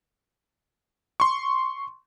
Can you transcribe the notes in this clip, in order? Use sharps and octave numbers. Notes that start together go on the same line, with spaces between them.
C6 C#6